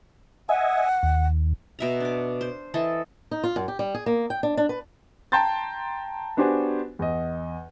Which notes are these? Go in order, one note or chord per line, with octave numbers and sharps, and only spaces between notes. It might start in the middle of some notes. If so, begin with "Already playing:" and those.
D#5 E5 F#5 G#5
D#2
B2 E5 A#5
D4 D6
C5
E3 A4 D#5
D#4
F4
F#2
G4
G3
G#4
A#3
G5
D4
D4
B4
G5 A5 A#5 C6 G6 A6
B3 D4 F#4 G4 C5 G#5
E2 D#5